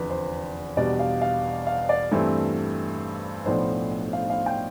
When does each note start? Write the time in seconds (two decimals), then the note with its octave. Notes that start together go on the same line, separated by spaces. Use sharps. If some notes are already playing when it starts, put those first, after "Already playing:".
Already playing: F1 E2 D3 F3 B4
0.10 C5
0.77 E2 B2 G3 D4 D5
0.99 F5
1.22 F5
1.67 F5
1.89 D5
2.11 G2 E3 A3 C4
3.46 B1 A2 F3 B3 D4 C5
4.13 F5
4.30 F5
4.46 G5